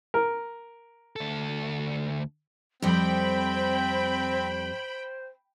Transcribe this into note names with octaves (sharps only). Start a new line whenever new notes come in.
A#4
D2 A4
F2 G3 C4 C5 G5 B5